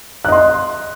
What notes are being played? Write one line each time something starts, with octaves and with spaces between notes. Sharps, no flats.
D#5 C6 F#6